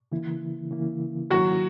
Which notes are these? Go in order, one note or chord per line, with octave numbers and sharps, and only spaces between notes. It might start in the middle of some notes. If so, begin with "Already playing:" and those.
C#3 E3 A#3 E4
C#3 E3 A#3 E4
G#2 D#3 F#3 A#3 C#4 E4 F#4